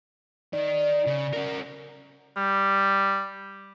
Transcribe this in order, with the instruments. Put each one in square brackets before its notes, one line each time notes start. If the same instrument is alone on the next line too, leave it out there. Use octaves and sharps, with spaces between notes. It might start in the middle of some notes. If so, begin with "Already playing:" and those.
[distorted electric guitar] D#3 [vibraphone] D5
[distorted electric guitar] C#3
C#4 A#4
[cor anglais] G3